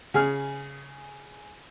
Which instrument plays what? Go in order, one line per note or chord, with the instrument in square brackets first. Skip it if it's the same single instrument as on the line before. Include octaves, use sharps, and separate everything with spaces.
[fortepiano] C#3 G#4 F6